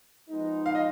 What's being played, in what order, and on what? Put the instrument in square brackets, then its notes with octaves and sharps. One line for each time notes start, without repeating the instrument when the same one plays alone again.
[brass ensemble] F3 G#3 B3 D#4
[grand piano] F5
D#5